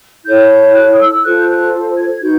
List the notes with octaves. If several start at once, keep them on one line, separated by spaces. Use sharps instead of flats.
E4 A4 C#5 G6
G6
G6
F#6
D#6
E6
F4 A4 C5 F#6
G6
F#6
G#6
D#4 F#4 B4 G6